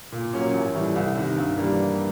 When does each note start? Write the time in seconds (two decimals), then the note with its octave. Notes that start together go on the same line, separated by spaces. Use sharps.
0.12 A#2
0.33 F#3 A#3 C#4
0.54 A1
0.74 A2 E3 G3
0.96 C2
1.15 C3 D#3
1.37 G2
1.58 E3 G3 A#3